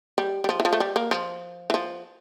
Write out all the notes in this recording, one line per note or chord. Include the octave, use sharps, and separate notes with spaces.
G3
G3
F3
E3
F3
A3
G3
A#3
F3
E3
F3